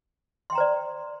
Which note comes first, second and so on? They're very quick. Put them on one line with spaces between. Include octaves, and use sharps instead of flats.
C6 G5 A#5 C5 D5